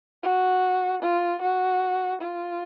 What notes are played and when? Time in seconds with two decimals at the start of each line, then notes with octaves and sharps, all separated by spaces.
0.23 F#4
1.02 F4
1.41 F#4
2.21 F4